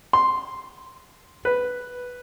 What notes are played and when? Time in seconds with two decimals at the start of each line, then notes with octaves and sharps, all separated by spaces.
0.13 C6
1.45 B4